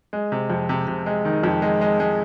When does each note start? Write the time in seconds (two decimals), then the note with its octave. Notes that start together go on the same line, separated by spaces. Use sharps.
0.13 G#3
0.32 C3
0.50 F2
0.69 C3
0.87 C3
1.06 G#3
1.25 D#3
1.43 F2
1.62 G#3
1.81 G#3
2.00 G#3